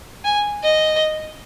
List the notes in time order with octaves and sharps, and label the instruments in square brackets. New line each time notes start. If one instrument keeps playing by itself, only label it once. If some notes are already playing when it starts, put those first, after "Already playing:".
[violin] G#5
D#5